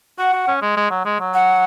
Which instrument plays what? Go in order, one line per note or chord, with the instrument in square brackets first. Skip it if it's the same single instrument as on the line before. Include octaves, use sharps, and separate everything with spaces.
[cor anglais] F#4 [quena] F#5
[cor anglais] F#4
C#4
G#3
G#3
F#3
G#3
F#3
[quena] F#5